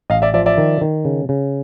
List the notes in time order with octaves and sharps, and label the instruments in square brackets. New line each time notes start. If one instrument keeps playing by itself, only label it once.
[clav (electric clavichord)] A1 [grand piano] D#5 F5
[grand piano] D5 E5
[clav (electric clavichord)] F3 [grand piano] D5 E5
[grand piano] D5 E5
[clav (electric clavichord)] D#3
D#3
C#3
C#3